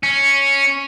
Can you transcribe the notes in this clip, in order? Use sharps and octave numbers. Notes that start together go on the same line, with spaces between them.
C#4